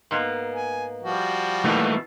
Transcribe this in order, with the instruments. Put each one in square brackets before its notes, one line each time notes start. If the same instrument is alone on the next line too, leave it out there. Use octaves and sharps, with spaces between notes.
[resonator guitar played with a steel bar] G#2 A#3 B3
[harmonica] G#5
F3 G3 F#4
[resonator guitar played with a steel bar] B2 D#3 E3 [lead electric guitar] A3 A#3